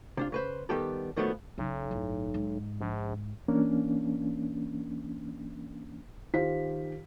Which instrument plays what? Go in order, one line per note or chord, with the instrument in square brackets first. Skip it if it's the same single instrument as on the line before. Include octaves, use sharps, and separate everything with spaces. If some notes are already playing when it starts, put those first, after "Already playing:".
[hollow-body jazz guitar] C3 D4 F4
C#3 B4 C5
D#3 G3 B3 G4 A4
A#2 D#3 F3 F#3 A3 B3
[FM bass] B1 [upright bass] C#3
[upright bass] G1 A2
G#2
[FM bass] A#1
[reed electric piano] E3 A#3 C#4 D4
[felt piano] D#3 F4 G4 C5 F5 B6